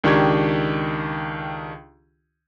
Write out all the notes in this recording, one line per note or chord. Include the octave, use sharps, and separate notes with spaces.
C#2 D#3 D4 G4 C#6 G#6